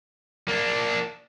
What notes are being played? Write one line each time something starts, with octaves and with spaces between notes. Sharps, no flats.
A#3 D4